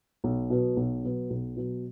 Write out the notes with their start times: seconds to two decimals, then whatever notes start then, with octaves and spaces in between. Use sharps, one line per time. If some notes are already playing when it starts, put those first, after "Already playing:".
0.24 B1
0.50 B2 F#3 B3
0.77 B1
1.04 B2 F#3 B3
1.30 B1
1.56 B2 F#3 B3